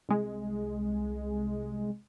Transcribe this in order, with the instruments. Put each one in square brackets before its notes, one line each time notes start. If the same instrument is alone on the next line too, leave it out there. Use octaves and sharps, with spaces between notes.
[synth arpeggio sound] C2 G#3